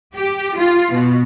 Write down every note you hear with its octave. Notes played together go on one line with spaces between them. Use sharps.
G4
F4
B2